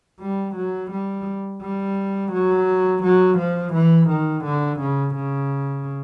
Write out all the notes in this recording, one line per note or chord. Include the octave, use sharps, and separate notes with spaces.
G3
F#3
G3
G3
F#3
F#3
F3
E3
D#3
D3
C#3
C#3